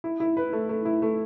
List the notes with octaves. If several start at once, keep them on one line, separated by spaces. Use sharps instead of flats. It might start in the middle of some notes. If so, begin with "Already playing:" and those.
E4
E4
B4
A3
A3
E4
A3